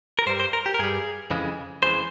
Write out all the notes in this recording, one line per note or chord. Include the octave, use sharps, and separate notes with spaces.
A#4
G2 G3 C5
C5
A#4
G4
A#4
G2 G3 G#4
F2 C#3 E3 G#3
F2 C#3 E3 G#3 C5